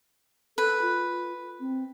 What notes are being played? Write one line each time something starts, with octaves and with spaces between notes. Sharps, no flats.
A4 B4
F4
C4